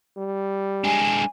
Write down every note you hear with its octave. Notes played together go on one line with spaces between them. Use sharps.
G3
G#3 D4 G#5